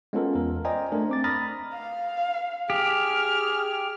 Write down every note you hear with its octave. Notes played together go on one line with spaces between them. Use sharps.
G#3 B3 C#4 F4 A4 A#4
E2 A#4
C5 D5 D#5 G5 G#5 A#5
A3 D4 A#4
C4 D6 A6
A#5 B5 D#6 F6 A6 A#6
F5
G4 G#4 F6